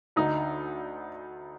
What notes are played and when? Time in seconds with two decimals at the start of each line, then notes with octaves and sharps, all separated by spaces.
0.16 D2 D3 D#4